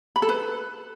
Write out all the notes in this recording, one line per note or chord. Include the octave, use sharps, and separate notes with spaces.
B5
A4
B4